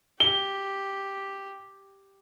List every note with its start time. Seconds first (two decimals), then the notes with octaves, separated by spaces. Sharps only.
0.20 G4 G7